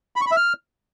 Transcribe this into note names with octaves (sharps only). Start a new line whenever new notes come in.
B5
C#6
B5
E5
F6